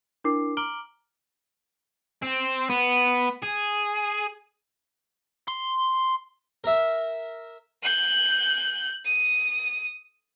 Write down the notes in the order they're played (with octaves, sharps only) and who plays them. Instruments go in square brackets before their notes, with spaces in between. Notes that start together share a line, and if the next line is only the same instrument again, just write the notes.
[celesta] D4 E4 A#4 D6 C7
A#5 D6 F6 D7 F#7 G7
[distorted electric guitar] C4
B3
G#4
[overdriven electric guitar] C6
[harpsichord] A#4 E5
[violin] F#6 G6
D#6